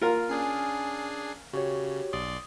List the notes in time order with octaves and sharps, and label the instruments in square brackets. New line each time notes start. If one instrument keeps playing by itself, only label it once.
[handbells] A#3 [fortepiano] F4 A#4
[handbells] C#4 G#5 D#6 [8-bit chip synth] D4 G#4 C7
[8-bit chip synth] C#3 [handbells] F#4 G4 C#5
[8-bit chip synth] B1 D5 C6 [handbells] D#6